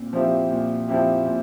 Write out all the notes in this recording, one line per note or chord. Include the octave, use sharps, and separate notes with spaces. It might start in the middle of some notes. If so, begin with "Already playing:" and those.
Already playing: A#2 C4
F3 C4 E4 G4
A#2
F3 C4 E4 G4
A#2